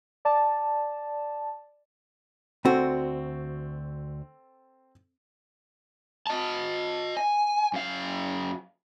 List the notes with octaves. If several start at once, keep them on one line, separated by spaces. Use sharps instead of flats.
D5 A5
D2 C4 F#4 A4
D#5 A5
G#5
F#2 F5